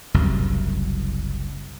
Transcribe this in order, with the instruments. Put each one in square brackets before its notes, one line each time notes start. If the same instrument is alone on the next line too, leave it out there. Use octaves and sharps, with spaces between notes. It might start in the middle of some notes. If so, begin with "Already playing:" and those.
[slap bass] F#1 C2 F#2